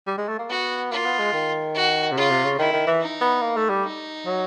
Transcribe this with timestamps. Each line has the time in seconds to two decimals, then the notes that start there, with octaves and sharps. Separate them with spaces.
0.07 G3
0.18 G#3
0.28 A3
0.39 A#3
0.50 B3 F#4
0.91 A#3 F4
1.05 B3
1.19 G#3
1.33 D#3
1.75 F#4
2.12 C3
2.17 C#3 F4
2.31 C3
2.44 C#3
2.59 D#3 E4
2.73 D#3
2.87 E3
3.00 D#4
3.21 B3
3.42 A#3
3.57 A3
3.69 G3
3.84 D#4
4.26 F#3